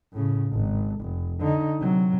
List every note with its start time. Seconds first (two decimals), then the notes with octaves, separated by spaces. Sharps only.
0.12 A2 C#3
0.51 G#1
1.00 F1
1.39 D3 D#4
1.80 C3 F#3